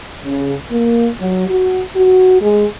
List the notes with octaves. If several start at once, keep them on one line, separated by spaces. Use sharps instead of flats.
C#3
A#3
F#3
F#4
F#4
G#3